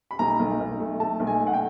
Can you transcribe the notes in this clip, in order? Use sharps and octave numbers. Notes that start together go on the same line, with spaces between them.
B5
B1 A#5
B1
B1
A3
A3 A5
B1
G#5
A3
F#5
G5